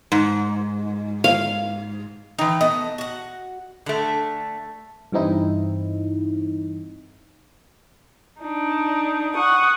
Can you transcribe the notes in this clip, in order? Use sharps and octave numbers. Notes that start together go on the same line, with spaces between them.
G#2
F5
E3 D#4 G5
A3 B3 D#5
F#4 F#5
D3 A3 A4
G2 E3 C4 D#4 E4
D4 D#4
F#5 C#6 D#6